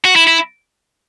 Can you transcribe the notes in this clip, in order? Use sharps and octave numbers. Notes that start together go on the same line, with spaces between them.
F#4
E4
E4